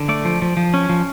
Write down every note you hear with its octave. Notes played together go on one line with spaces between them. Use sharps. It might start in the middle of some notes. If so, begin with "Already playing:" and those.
Already playing: D3
A3 D5
F3
F3
F3
C#4
F3